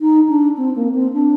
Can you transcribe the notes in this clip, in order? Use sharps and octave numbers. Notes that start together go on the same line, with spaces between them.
D#4
D4
C4
A#3
C4
D4